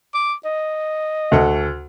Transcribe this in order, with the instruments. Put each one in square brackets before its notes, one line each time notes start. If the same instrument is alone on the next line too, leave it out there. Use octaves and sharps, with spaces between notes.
[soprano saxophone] D6
D#5
[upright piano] D2 A4 F#5